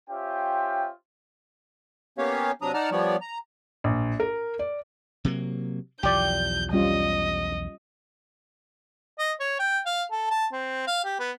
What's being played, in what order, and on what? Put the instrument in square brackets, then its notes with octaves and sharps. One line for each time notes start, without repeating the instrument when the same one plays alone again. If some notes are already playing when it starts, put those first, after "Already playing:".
[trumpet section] C#4 F4 G4 C5 E5 G5
[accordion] A#3 B3 C#4 G4 C#5 F5
C3 F#3 D4 A#5 D#6
D#4 D5 F#5 A5 A#5 F6
F3 G3 B3 C#5 D5
A#5
[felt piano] A#1
A#4
D5
[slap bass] C3 F#3 A#3
[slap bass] B1 E2 F3 [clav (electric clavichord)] G4 D5 [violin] G6
[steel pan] G3 C#4 F4 [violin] D#5
[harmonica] D#5
C#5
G5
F5
A4
A5
C4
F5
G4
B3